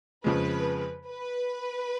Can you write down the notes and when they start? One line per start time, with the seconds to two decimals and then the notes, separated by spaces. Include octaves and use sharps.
0.24 F2 C#3 F3 G#3 B4
1.07 B4